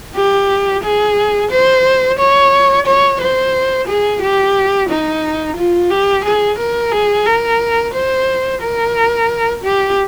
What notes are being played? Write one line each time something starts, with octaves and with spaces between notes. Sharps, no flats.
G4
G#4
C5
C#5
C#5
C5
G#4
G4
D#4
F4
G4
G#4
A#4
G#4
A#4
C5
A#4
G4